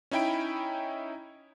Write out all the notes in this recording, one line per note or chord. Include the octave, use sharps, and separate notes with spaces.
C#4 D#4 E4 G5 B5 D7